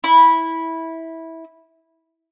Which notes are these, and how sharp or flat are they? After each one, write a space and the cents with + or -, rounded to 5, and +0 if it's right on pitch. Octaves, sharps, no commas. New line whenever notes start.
E4 -15